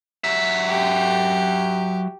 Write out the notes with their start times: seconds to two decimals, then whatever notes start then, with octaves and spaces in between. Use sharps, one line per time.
0.24 F#3 E5
0.68 G4